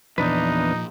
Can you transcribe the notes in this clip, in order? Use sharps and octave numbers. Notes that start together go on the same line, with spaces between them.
E2 A#2 F3 D4 D#4 B4